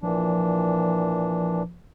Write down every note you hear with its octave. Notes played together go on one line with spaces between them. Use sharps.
A#2 E3 F3 D4